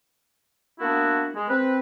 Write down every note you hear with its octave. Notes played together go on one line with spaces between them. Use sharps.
A#3 B3 D4 E4 F#4
G#3
C4 B4